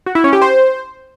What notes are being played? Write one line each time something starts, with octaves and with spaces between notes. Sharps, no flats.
F#4
E4
C#4
G4
C5